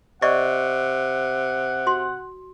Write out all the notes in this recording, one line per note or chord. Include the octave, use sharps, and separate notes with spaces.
C3 D5 D#5 F#5 C#6
F#4 C6